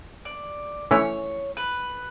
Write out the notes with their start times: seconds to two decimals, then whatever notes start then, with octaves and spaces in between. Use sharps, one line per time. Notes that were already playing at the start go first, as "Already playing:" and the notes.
0.25 D5
0.91 E3 A3 C#4 E4 C#5
1.57 B4